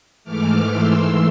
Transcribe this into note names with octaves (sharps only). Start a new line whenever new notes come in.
G#2 E3 A3 D6 F6
C6 E6